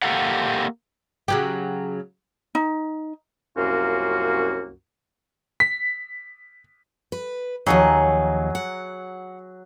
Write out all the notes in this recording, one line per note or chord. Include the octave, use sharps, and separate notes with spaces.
A#3 G4 A4 F5 F#5
C#3 F#3 G4
D#4
C2 F#2 A#3 C#4 F4 F#4
B6
B4
D#2 F3 F#3 D#4 G#4
F#5